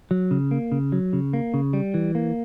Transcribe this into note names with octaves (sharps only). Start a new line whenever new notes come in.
F#3
C#3
A#3
C#3
F#3
C#3
A#3
C#3
G3
E3
A#3